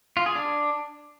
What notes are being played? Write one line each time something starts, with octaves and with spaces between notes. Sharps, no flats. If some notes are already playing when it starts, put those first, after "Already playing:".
F4
G#4
D4